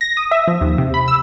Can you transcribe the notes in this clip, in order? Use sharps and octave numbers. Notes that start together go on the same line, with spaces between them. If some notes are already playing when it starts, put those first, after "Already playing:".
A#6
D#6
E5
F3
D#2
C3
B5
E6